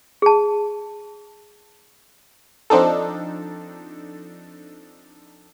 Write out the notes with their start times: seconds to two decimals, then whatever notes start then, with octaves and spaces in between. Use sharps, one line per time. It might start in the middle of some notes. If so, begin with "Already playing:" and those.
0.22 G#4 A5
2.70 F3 C4 D4 D#4 A4